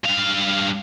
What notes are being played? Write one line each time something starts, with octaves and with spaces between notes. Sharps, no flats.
G2 F5